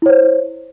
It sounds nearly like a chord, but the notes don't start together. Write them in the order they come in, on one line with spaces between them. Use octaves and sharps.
E4 C#5 C5